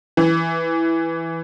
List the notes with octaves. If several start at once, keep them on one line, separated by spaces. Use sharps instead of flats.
E3